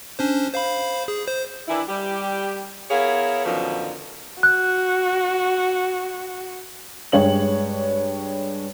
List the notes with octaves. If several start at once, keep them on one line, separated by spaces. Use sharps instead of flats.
C#4 D4 C5
C5 F5 B5
G#4
C5
D#3 E3 D4 E4
G3 G4
B3 E4 G#4 A#4 C#5 F5
F#2 B2 D3 D#3 F3
F#4 F#6
G2 G#3 C#5 G5 F#7